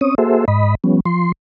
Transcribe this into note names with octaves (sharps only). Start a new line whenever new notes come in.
C4 C#4 C#5 D#6
A#3 F#4 G#4 A4 C5 E5
G#2 D#5 B5
F3 G3 B3 C#4
F3 C6